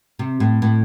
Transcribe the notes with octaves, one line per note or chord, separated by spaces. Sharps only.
C3
A2
A2